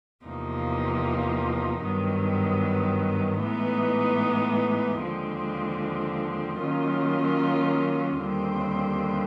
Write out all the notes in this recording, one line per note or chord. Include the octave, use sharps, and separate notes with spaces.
E2 C3 F3 A#3 D#4
G2 D#3 F#3 B3
A2 E3 G#3 B3 D#4
D#2 D3 F3 G#3 C4
D#3 F#3 A#3 C#4 F4
D#2 D3 G3 C4